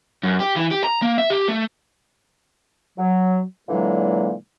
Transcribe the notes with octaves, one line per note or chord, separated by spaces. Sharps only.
F#2
G4
E3
G4
A#5
A#3
E5
G4
A3
F#3
A#2 D3 E3 F#3 G#3 A#3